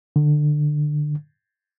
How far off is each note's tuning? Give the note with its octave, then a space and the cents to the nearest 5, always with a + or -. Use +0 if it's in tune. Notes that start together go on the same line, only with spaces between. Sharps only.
D3 +20